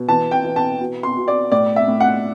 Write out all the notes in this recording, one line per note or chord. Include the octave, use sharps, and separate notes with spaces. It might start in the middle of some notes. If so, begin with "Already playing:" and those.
Already playing: B2
E3 A5
G5
E3
A5
B2
C6
B2
D5
A2 D5
E5
A2
F#5